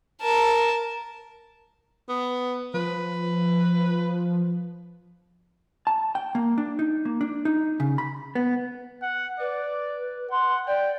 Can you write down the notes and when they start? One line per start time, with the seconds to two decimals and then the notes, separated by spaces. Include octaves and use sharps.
0.21 A#4 A5
2.09 B3
2.74 F3 B4
5.87 A5
6.15 G5
6.35 A#3
6.58 D4
6.79 D#4
7.05 A#3
7.21 D4
7.45 D#4
7.80 C#3
7.98 B5
8.35 B3
9.02 F#5
9.40 B4 D5
10.31 F#5 C6
10.67 D5 G5